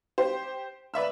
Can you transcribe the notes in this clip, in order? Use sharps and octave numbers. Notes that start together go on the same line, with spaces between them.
G4 C5
B4 D5 E5 E6